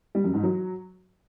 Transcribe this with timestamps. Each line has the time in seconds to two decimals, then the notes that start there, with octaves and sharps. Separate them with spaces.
0.15 G3
0.24 F#2
0.34 G#2
0.43 F#3